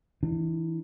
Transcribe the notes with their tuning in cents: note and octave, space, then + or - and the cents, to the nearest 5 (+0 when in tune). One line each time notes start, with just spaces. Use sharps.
E3 -10 D4 +35